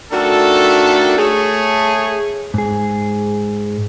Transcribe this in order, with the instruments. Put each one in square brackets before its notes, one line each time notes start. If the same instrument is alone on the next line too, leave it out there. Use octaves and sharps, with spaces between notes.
[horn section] D#3 A3 D4 F#4 A4
A3 G#4 C#5
[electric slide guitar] G#2 G#4